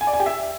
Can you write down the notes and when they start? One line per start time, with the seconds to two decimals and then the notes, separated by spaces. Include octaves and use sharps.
0.01 G#5
0.07 D5
0.13 G#5
0.20 G4
0.26 E5